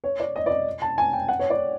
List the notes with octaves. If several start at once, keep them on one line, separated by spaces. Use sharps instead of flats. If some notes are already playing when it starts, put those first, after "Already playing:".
C#5
D5
D#5
D5
D#5
A5
G#5
G5
F#5
C#5
D5